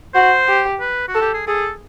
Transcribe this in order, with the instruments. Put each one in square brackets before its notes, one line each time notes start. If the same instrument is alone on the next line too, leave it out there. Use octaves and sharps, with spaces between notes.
[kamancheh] F#4 [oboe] C5
[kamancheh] G4
[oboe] B4
F#4
[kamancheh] A4
[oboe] G4
G#4
[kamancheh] G#4 [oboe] A4